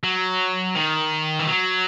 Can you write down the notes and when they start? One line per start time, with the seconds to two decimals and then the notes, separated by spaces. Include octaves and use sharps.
0.03 F#3
0.75 D#3
1.39 E3
1.47 F#3